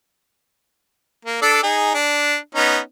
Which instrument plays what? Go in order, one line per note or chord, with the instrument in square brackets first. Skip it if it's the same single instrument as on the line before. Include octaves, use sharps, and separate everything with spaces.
[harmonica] A#3
D4 A4 D5
D#4 G#4
D4
B3 C#4 D#4